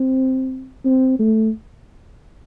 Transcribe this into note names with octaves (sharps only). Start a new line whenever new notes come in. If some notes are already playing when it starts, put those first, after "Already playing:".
Already playing: C4
C4
A3